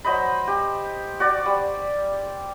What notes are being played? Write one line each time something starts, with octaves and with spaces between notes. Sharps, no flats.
F#3 C5 D#5 B5
G4
F#4 D5
G3